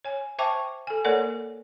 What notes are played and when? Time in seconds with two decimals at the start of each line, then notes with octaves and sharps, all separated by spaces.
0.05 C#5 G#5
0.39 C5 E5 G5 A5 C#6 D6
0.87 A4 G#5
1.05 A#3 A4 A#4 C#5 D5 F#5